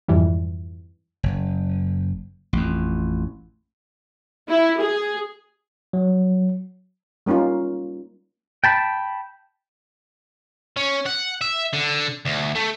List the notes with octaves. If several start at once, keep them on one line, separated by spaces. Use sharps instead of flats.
F2 G#2 E3 G3
F#1
A1 F2
E4
G#4
F#3
G3 A#3 C#4 D#4 F4
G5 A5 B5
C#4
F#5
E5
D3
D2
A3